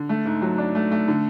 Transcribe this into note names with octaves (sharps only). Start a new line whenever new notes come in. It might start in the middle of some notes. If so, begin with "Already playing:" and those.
Already playing: D3
A3
G#2
F#3
D4
A3
A3
D3